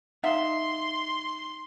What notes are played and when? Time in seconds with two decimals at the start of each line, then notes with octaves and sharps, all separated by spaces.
0.23 D#4 E5 F5 C6